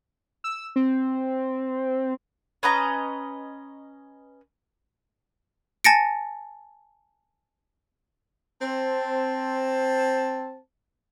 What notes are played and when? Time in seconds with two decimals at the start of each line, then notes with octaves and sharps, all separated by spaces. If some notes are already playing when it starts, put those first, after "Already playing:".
0.44 E6
0.76 C4
2.63 C#4 B4 D#5 A#5
5.84 G#5 A5 A6 A#6 C#7 D7
8.62 C4 A5